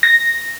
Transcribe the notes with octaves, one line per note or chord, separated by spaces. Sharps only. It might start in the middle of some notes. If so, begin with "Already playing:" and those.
A#6